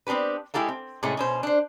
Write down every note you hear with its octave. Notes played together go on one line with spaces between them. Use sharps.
B3 C4 D4 G4 B4
G#3 E4 G4 A4 F5
C4
A2 C3 G#3 A3 C#4
B2 C#4 C5
D4 C5